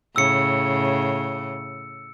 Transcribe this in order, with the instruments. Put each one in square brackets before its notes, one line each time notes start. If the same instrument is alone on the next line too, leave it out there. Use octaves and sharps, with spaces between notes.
[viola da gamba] A2 C#3 [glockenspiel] E6 C#7